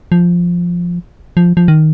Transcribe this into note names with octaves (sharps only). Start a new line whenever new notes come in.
F3
F3
F3
D#3